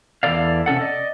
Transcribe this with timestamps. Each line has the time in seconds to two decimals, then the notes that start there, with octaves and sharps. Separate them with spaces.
0.23 E2 E3 F#4 A4 D5 F5
0.66 C3 C#4 A4 F#5
0.81 D5 D#5